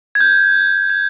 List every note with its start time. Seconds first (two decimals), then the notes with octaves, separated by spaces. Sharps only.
0.15 G#6
0.20 G6
0.90 G#6